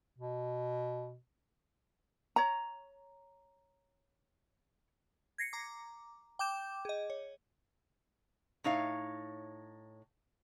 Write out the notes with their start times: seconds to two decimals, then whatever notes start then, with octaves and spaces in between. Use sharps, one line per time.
0.18 B2
2.36 C#5 A#5
5.38 G#6 A#6 C7 C#7
5.53 A#5 D6
6.39 G5 D6 G6 E7
6.85 G#4 D#5
7.10 C#5
8.64 A2 D#4 C#5 F5